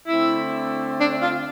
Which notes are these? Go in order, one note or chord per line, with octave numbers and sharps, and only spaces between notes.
D3 A3 C4 E4
D4
F4